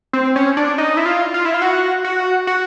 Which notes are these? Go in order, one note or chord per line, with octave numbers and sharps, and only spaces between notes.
C4
C#4
D4
D#4
E4
F4
F4
E4
F4
F#4
F#4
F#4